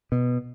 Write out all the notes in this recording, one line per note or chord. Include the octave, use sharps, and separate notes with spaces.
B2